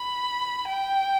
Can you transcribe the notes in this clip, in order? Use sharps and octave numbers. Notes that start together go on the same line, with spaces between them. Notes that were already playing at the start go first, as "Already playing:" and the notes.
Already playing: B5
G5